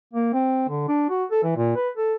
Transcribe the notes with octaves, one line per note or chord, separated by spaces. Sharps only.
A#3
C4
D3
D4
F#4
A4
E3
A#2
B4
A4